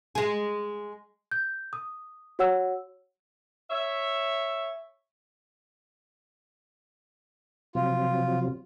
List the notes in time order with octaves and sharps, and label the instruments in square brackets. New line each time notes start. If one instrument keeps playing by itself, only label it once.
[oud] G#3 G#4
[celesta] G6
D#6
F#4 C#5 F#5 E6
[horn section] C#5 E5
[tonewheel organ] C3 F3 F#3 [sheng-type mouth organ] F4